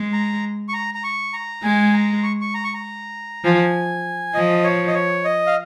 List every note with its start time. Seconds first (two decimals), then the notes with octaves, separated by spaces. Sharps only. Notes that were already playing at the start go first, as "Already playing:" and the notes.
Already playing: G#3
0.13 A#5
0.69 C#6
0.73 A#5
0.95 A#5
1.04 C#6
1.33 A#5
1.63 G#3 G#5
1.94 A#5
2.23 C#6
2.41 C#6
2.54 A#5
2.64 C#6
2.74 A#5
3.44 F3 G#5
4.34 F3 D#5
4.64 C#5
4.87 D#5
4.94 C#5
5.25 D#5
5.47 F5